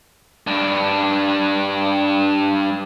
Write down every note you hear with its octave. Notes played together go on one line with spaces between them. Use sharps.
G2 D4